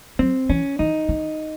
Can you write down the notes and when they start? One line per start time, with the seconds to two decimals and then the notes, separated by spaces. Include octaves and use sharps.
0.19 F#3 C4
0.49 E3 C#4
0.79 E3 D#4
1.09 D#3